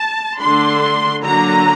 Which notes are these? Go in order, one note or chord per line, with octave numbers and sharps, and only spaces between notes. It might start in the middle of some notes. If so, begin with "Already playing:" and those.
Already playing: A5
D3 A3 D4 C6
D3 F#3 A#3 D4 A#5